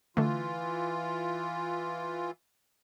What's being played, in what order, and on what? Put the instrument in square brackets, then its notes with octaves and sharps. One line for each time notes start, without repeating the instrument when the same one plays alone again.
[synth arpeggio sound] D3 A3 [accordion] E3 F4